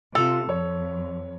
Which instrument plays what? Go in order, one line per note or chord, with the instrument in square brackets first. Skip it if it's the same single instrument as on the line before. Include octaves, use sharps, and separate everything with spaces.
[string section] C3 [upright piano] F4 F7 [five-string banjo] A4 [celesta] E6
[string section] F2 [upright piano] C#5